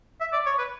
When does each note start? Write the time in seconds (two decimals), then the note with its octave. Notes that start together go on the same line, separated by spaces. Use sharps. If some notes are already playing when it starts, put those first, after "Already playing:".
0.21 E5
0.33 D5
0.46 C#5
0.58 B4